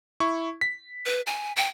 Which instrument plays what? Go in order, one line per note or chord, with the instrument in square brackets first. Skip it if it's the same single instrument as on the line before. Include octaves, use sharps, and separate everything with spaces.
[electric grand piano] E4 C#6
B6
[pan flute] B4
G#5
G5